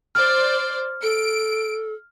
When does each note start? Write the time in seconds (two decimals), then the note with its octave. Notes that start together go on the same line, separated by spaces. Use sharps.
0.15 C5 D5 F6
1.02 A4 D7